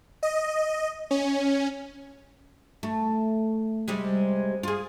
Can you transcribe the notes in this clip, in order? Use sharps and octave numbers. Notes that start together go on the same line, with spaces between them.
D#5
C#4
A3
C3 G3 G#3
F4 G#4